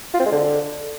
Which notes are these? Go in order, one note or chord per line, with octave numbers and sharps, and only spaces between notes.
F4
C4
G#3
D3